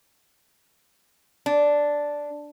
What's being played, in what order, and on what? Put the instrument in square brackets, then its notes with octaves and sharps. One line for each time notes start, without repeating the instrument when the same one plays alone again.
[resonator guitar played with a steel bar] D4